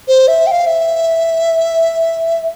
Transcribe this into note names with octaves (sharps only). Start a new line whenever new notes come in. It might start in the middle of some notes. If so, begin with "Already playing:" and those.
C5
E5
G5
F5
E5